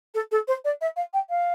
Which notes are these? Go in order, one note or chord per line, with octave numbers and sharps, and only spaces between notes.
A4
A4
C5
D5
E5
F5
G5
F5